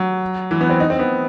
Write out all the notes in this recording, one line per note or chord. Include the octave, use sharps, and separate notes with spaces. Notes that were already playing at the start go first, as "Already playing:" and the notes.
Already playing: F#3
E3
B3
C4
D#4
C4
B3